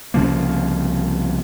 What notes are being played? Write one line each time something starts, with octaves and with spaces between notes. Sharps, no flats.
C2 C#3 F3 A#3